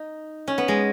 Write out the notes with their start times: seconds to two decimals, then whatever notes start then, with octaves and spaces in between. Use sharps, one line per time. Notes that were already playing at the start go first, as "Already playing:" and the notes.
Already playing: D#4
0.48 C#4
0.58 B3
0.68 G#3